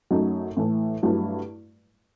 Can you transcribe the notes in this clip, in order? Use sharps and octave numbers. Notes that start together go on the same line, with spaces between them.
F#2 F#3 A3 D#4
A2 E3 A3
G2 F#3 A3 E4